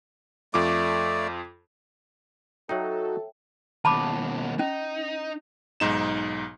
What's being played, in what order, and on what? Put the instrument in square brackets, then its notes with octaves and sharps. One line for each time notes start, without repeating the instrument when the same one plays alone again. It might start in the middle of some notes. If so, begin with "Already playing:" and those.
[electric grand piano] F2 F4 D6 [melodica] A3 D5
[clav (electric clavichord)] F#3 D#4 [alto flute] F#4 [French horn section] A4 [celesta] C#5 E5 G5
[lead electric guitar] D#2 B2 [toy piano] A5 B5 D6
[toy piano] C#4 [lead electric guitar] D#4
[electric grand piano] B1 G#2 D#4 E7